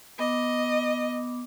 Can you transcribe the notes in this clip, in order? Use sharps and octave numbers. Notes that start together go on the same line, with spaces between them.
B3 D#5 D6